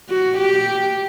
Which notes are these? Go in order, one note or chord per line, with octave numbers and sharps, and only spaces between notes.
F#4
G4